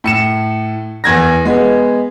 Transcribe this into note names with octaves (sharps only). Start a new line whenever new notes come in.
A2 C#7 E7
E2 G#6 A#6
G#3 B3